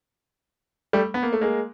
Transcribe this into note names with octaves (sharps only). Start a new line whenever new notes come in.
G3 A3
B3
A#3
A3
G#3 A#3